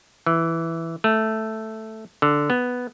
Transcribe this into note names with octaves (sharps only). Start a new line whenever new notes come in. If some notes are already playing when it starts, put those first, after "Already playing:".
E3
A3
D3
B3